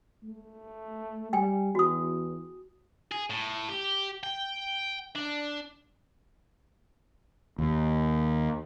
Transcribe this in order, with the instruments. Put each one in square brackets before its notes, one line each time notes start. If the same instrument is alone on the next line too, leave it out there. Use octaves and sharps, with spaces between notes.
[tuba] A3
[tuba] G3 [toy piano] G5 G#5
[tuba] E2 [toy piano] F#4 D#6
[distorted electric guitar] G#4
A2
G4
G5
D4
[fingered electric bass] D#2